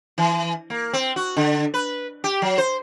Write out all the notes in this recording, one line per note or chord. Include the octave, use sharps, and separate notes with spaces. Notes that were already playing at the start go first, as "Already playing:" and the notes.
E3
A#3
C4
F#4
D3
B4
G4
F#3
C5